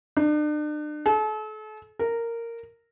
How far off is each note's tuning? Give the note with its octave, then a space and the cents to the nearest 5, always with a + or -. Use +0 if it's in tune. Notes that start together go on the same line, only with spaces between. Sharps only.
D4 +40
A4 -40
A#4 -10